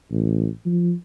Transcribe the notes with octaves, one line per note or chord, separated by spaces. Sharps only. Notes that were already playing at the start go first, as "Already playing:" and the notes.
A1
F3